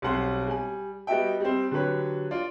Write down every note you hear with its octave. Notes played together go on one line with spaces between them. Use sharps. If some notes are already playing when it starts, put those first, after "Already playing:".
B1 G3 C4 F#5 C6
G3 G#5
G3 B3 F#4 D#5 E5 G5
G3 C4
D3 F#3 G4 B4 C#5
F4 D5